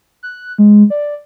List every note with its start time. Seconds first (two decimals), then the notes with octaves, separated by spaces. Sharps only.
0.23 F#6
0.58 G#3
0.90 D5